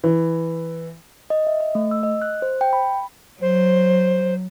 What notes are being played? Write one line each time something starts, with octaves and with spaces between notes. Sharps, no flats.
E3
D#5
E5
D#5
A3
E6
D#5
F#6
C5
G5
B5
F#3 C5